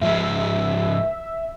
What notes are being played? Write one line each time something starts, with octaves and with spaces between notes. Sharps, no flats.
G#2 F3 G#3 E5